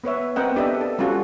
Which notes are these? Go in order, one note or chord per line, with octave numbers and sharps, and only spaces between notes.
B3 B4 C#5 E5
B3 C4 A#4 D#5 F#5 G5
D4 G4 A4 B4 D#5 E5
A4
G3 C#4 F4 F#4 A4